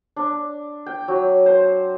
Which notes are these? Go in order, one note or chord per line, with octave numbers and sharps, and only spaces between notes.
D4
G5
F#3
C5